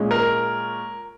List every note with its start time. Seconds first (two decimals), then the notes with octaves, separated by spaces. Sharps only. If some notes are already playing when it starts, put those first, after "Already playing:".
Already playing: A#2 G#3 C#4
0.11 A#4